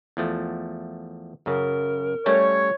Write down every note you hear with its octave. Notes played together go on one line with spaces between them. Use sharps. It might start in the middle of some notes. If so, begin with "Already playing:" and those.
E2 F3 A3
F#2 C#3 A#4
G3 A3 C#4 C#5